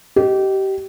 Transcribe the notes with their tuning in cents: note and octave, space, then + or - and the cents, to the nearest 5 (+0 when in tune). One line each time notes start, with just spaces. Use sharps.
G4 -25 D#5 +0